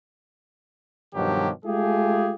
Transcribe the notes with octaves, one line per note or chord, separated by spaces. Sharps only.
G2 B2 D#3 F3 F#3 G4
G#3 A3 F4 G4 G#4